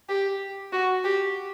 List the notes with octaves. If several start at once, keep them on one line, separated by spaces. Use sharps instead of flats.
G4
F#4
G4